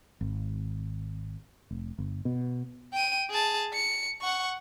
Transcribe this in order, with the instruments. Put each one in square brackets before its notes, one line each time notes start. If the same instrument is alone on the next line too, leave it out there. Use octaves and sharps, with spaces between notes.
[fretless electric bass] G#1
F1
G1
B2
[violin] G5 D#7
G#4 A5
C#7
F#5 C#6